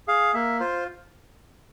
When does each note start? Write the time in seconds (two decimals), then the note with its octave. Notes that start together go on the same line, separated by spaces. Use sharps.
0.08 G#4 F5
0.34 A#3 E5
0.60 F4 C5